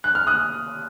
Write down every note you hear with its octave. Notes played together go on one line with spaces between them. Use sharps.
F#6
F6
D#6 F#6